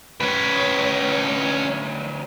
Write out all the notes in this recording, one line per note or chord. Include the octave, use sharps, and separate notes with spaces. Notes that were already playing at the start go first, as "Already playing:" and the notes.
D2 C#4 B4 C#5